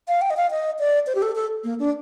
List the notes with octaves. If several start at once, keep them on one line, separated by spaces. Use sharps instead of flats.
F5
G5
D#5
F5
D#5
D5
C5
G4
A4
A4
A#3
D4